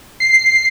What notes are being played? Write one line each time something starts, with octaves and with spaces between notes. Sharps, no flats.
C7